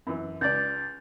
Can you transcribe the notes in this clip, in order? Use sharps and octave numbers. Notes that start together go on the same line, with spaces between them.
F#2 E3
C#2 D5 G6 A6